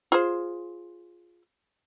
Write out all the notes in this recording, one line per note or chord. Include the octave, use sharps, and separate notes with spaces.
F4 G#4 C5